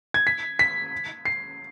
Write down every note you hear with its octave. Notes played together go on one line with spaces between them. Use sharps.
G#6
B6
B6
C7